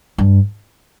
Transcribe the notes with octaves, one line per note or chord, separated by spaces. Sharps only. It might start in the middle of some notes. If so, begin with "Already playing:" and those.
G2